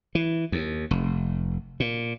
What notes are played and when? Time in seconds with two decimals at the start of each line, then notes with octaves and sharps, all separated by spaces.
0.15 E3
0.52 D#2
0.91 F1
1.80 A#2